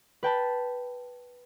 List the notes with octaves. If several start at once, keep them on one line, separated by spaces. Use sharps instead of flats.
B4 G5 A5 B5